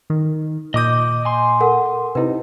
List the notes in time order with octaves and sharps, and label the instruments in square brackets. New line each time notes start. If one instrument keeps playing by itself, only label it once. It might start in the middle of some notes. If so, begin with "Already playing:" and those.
[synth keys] D#3
[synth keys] A#2 D#6 [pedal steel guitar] D#5 D6 G6
[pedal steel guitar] G#5 C6
[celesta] A4 A#4 F#5
[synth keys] C3 D#4 [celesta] E4 B4